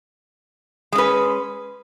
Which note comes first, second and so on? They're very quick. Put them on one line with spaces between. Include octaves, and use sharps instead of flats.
G#3 C#4 B4